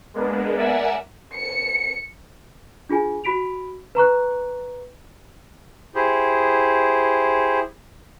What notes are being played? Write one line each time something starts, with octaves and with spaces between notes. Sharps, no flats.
G#3 A#3 B3 D4
A#4 D5 E5 F#5 G#5 E6
C#7
D4 F4 G#4 G#5
F#4 B5 B6 D7 F7
B4 A#5 C#6 F#6
E4 G4 G#4 C5